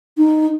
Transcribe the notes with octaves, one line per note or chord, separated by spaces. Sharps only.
D#4